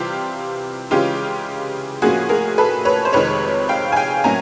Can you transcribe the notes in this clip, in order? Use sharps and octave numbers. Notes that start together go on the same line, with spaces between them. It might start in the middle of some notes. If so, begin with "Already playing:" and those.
Already playing: C3 E3 G3 F4 G4
C#3 E3 G#3 C#4 F4 G4
A2 F3 A#3 C#4 F#4 G#4
G#4 A#4
A4 B4
B4 C#5
C5
F2 C3 D#3 G#3 B4 C#5
F5 G5
G#5
F5 G5
A2 F#3 A#3 C#4 G#5 A#5